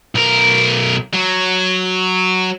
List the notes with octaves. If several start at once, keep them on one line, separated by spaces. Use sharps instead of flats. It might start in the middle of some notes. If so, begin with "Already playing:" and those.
B1 A#4
F#3